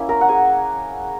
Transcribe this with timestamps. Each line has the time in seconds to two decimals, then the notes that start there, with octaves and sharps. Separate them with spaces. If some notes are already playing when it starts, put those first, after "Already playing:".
Already playing: A#3 C#4 E4
0.09 A#4 A#5
0.21 F#5
0.28 G#4 G#5